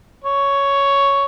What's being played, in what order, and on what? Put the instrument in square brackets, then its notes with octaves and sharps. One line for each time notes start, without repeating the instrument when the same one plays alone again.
[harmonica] C#5